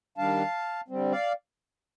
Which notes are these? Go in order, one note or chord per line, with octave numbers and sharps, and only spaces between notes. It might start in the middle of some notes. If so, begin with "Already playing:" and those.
D#3 G3 D4 F5 A5
D3 G3 C4
D5 F5